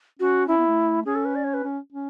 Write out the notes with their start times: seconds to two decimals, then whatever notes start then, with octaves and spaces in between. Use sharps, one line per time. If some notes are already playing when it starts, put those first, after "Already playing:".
0.19 C#4 F#4
0.48 C#4 E4
0.58 B3
0.68 A3
1.06 C#4 G#4
1.15 A4
1.25 B4
1.35 D5
1.44 C#5
1.54 B4
1.63 C#4
1.92 C#4